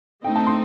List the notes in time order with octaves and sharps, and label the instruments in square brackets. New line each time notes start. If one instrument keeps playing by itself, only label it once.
[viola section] A3 C4 D#4 [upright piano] G5
[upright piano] A5
C6